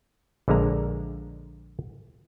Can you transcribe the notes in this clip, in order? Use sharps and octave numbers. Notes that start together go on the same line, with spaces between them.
A#1 D3 G#3 A#3 A#5